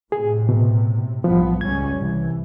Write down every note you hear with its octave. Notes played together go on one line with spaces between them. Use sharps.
A2 C3 G#4
B2
B1 G2 F3 B3
C#2 G3 C#4 G#6
C2 E3